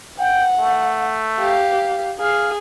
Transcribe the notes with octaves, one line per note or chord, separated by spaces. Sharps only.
F#5 G5
A3
G4 F5
G#4 F5